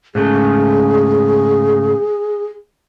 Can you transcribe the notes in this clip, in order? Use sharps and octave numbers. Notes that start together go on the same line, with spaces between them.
G#2 C#3 A3 G#4